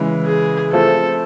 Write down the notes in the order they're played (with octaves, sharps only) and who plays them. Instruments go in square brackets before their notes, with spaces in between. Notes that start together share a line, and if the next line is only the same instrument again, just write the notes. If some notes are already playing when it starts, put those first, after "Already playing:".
Already playing: [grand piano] C#3 E3 G#3
[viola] G#4
[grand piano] F3 A3 C4 E4 [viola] A4